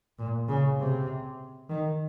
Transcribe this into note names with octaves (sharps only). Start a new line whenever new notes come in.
A#2
C#3
C3
D#3